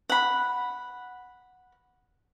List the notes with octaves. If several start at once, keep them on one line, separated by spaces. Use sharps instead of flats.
F#5 B5